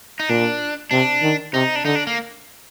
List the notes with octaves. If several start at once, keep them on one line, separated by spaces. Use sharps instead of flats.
D#4
A#2 D4
C3 D4
D#3
C3 D#4
D4
D3 D#4
D4
A#3